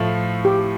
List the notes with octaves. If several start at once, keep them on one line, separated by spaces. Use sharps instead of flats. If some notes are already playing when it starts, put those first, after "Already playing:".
Already playing: A2 F3 A3
G4